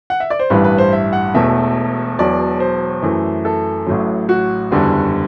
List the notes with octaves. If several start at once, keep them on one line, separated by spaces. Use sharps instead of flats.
F#5
E5
D5
C5
A1 G2 E3 G3 B4
B4
C5
E5
F#5
E1 E2 B2 A3 E5
E1 E2 B2 F#3 D5
C5
F#2 E3 A3
A4
A1 A2 F#3
F#4
F#1 E2 D3 G3